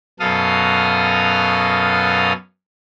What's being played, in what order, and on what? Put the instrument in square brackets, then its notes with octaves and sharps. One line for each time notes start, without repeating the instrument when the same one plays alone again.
[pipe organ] F#2 B2 A4 F5 D#6 F6